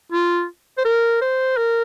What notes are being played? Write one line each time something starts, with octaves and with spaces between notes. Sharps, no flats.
F4
C5
A#4
C5
A#4